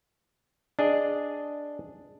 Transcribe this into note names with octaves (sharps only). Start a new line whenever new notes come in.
D4 G#4 D#5